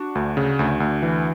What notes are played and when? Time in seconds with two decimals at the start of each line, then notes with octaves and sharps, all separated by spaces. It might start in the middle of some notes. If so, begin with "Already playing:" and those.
Already playing: D4 F#4
0.15 D2
0.37 C#3
0.59 D2
0.80 D2
1.02 E3